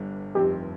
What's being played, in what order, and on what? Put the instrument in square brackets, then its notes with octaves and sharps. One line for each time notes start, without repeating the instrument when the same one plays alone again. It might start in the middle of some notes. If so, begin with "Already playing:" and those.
Already playing: [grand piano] G1 G2 D3 G3
[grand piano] F1 F2 D#3 G3 C4 [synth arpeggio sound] G4